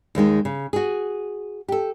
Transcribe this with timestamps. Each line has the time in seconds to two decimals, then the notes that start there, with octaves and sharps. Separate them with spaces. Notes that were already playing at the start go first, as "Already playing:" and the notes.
0.15 D#2 D#3 G#3 D#4
0.45 C#3
0.73 F#4 G#4
1.68 G4 A4